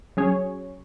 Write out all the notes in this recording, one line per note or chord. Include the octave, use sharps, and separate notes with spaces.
F#3 C#4 G#4 C#5